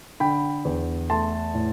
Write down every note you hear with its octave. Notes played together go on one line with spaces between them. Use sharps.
D3 G5 B5
E2
A3 A5 C6
A2